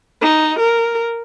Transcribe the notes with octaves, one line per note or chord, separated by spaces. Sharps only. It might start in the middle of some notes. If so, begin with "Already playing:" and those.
D#4
A#4